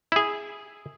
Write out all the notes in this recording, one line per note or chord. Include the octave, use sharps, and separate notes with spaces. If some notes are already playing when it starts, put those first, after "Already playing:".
E4 G#4